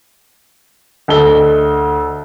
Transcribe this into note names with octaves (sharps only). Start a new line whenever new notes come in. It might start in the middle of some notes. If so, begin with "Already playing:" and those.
D2 A4 D#5 G7